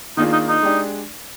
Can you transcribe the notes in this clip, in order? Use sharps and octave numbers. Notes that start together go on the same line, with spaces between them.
D#3 A#3 D4 D#4 F4 G#4
D#4
D#4
G#3 D4 G4 D5